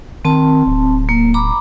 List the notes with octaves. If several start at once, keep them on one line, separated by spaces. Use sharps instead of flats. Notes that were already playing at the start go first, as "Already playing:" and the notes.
D#3 C4 A5
D1
A#3
A#5 B5 D6